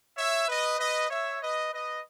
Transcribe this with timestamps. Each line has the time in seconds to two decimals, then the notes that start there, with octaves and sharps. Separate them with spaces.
0.17 C#5 E5
0.48 B4 D#5
0.79 B4 D#5
1.10 C#5 E5
1.41 B4 D#5
1.72 B4 D#5